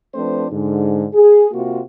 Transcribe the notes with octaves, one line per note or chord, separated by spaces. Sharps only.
F3 A3 C4 D4 B4 C5
G#2 D3
G#4
C3 A#3 F4 F#4